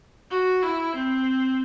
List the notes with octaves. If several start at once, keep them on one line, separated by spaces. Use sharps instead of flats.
F#4
E4
C4